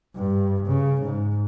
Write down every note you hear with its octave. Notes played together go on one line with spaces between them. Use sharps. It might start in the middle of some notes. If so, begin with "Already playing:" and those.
G2
C#3
G#2